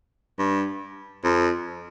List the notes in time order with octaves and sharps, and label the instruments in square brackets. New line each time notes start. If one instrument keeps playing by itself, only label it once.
[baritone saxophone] G2
F2